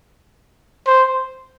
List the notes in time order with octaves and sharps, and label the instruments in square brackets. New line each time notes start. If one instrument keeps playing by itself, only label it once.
[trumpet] C5